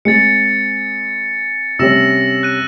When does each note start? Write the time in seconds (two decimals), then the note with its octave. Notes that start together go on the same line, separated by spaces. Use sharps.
0.05 G#3 C4 A6 C#7
1.79 C3 G3 C#4 E6 A#6 E7
2.43 F#6 D#7